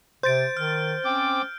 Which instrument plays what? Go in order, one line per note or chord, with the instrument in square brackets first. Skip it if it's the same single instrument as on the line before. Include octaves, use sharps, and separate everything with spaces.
[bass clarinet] C3 [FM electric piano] C5 A6 [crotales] G6 D7
[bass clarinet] D#3 [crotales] F6
[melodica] C4 D6 [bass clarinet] C#4